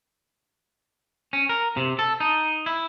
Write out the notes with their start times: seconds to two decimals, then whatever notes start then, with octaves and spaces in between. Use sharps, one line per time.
1.33 C#4
1.49 A#4
1.77 C3
1.99 A4
2.20 D#4
2.66 E4